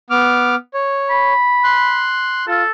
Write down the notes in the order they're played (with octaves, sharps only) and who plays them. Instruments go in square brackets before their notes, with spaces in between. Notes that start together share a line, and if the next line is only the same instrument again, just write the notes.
[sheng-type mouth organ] B3 D6 F6
C#5
[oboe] B5
[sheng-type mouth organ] C6 F#6
[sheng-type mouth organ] F4 [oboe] A4